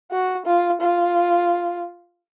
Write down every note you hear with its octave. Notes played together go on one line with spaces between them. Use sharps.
F#4
F4
F4